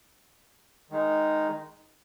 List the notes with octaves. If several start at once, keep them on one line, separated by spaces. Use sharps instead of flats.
D#3 G#3 D#4